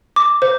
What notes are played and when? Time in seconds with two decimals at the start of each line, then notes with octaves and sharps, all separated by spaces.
0.16 D6
0.42 C5